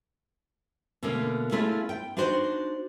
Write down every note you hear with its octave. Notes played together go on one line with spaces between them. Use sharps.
B2 D3 A3 A#3 C#4
A3 C#4 E4 F4 G#4 A4
G5
D4 D#4 F#4 C5